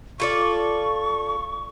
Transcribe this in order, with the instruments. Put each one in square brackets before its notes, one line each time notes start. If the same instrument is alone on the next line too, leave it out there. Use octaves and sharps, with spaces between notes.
[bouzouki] F4 A4 D5 [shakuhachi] C#6